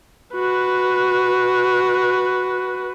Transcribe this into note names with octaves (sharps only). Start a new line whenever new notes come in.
F#4 B4